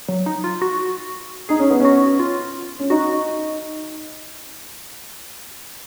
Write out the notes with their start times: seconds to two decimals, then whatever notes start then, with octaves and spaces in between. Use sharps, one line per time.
0.09 F#3
0.26 D#4
0.44 F4
0.61 F#4
1.49 D#4 G#4
1.59 C#4
1.70 B3
1.80 C#4 F#4
2.19 F4
2.80 C#4
2.90 D#4 F#4